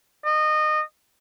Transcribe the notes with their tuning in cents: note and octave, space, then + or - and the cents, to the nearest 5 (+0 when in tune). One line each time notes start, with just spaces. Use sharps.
D#5 -25